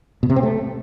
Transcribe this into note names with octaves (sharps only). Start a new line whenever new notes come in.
B2
C3
C4
A3